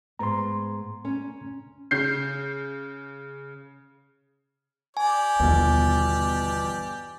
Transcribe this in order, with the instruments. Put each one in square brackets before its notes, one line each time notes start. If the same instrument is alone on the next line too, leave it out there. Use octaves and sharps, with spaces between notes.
[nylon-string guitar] G#2 B3 [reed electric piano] A#5 C6
[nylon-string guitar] C#4
[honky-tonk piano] C#3 G6 C7
[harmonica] G4 D5 [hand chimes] G#5
[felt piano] G1 B2 [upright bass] D#2 E3